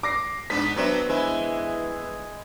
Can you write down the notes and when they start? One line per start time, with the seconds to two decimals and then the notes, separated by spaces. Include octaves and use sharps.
0.03 D6 A#6 C7
0.50 G#2 B3 D4 B6
0.76 F#3 B3 C4 D4 B4 E5
1.09 E3 G#3 E4